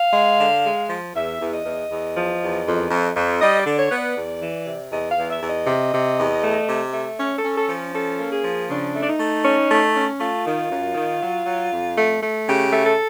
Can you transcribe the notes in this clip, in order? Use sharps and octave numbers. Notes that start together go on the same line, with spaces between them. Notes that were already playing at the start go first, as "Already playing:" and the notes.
Already playing: F5
G#3
D3
G#3
F3
E2 E5
E2
D#5
E2
E2
F3
E2
F2
F2
F2
G3 D#5
D5
D3
C#5
B3
D5
E2
E3
C3
E2 D#5
F5
E2
E5
E2
D#5
C3
C3
E2
A3
C3
A3
C#4 C#5
A4
C#4
A4
F3
C#4 A4
A#3
G#4
F3
C#3 D4
A3
D4
D#4
A3
C#4
A3
C#4
A3 F4
D#3
F#2
D#3
F#3
F#3
F2
A3
A3
C#3 G4
A3
A4